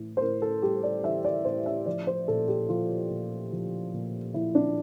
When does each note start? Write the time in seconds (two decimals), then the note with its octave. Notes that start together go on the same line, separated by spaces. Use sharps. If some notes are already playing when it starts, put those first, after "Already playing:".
Already playing: A2 E3
0.17 C5
0.21 A2 A#4
0.42 A4
0.63 G3 G4
0.83 D5
1.04 E3 E5
1.25 D5
1.45 A2 C5
1.66 E5
1.86 F3 D5
2.07 C5
2.28 A#2 A4
2.48 G4
2.69 F3 F4
3.10 A#2
3.52 F3
3.93 A#2
4.34 F3 E4
4.55 D4